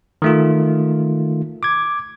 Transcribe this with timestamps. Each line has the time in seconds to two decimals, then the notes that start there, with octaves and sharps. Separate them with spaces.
0.22 D#3 A3 F4
1.63 D6 G#6